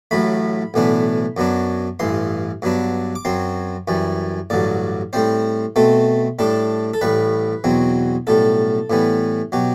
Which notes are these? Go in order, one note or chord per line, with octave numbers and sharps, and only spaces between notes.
A1 A2 F#3 A3 B5
B1 A2 E3 B3 D4
F#2 F#3 B3 D4
A1 G2 E3 C6
G2 F#3 B3 D4
D6
F#2 F#3 C4 C6
F#2 E3 G3
A1 G2 D3 F#3 D5
A2 G3 C4 C5
B2 A3 C4 A4
A2 G3 D4 A4
A4
A1 A2 G3 B4
E2 B2 F#3 C4
B1 A2 G3 A4
A2 E3 G3 B3
B2 F#3 G4